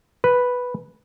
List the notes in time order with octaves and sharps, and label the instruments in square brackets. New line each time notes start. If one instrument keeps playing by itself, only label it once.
[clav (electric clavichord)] B4